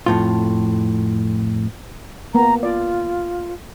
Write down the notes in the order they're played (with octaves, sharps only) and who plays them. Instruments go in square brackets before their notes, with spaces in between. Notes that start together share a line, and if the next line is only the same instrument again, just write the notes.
[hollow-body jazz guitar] F2 A2 F4
[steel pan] A#3 B3 [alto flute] A#5
[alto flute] F4 [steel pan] D5